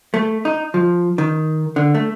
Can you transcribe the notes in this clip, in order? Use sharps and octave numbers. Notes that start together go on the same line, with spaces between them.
A3
D#4
F3
D#3
D3
A3